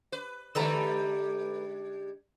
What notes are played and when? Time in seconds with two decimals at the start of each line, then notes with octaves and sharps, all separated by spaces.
0.12 B4
0.55 D3 G3 G#3 A4 B4 A#5